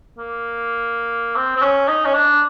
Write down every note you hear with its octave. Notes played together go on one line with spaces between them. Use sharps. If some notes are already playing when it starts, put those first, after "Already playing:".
A#3
C4
C4
C#4
D#4
C#4
D4